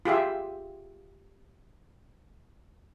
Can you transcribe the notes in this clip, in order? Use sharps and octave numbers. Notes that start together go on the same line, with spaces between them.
F4 G4 G#4 E5